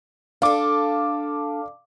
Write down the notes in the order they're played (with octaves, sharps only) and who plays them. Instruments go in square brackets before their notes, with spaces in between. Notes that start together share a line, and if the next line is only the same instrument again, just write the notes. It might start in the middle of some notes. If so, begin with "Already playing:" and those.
[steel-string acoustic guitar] D4 A4 [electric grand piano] F5 D6